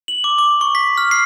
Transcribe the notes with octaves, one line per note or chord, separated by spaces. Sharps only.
F#7
D6
D6
C#6
B6
F6
C7